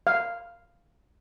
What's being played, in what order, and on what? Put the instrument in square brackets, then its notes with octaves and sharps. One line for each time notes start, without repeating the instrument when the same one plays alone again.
[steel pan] F5